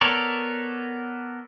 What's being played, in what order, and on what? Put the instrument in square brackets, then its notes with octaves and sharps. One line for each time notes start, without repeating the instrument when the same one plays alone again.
[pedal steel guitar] B3 A4 A#4 C#5 D5